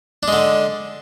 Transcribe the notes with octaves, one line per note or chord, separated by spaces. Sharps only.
D3 G#3 D4